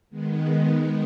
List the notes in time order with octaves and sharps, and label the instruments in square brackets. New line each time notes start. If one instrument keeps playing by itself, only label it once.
[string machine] D#3 G#3 B3